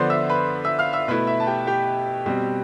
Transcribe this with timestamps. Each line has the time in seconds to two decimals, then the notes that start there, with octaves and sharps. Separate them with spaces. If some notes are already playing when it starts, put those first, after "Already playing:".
Already playing: D3 F3 B3 D4 C5 C6
0.10 E5 E6
0.29 B4 B5
0.65 E5 E6
0.79 F5 F6
0.93 E5 E6
1.08 B2 A3 E4 B4 B5
1.27 E5
1.40 A5
1.47 G4 G5
1.67 G4 G5
2.26 B2 G3 C4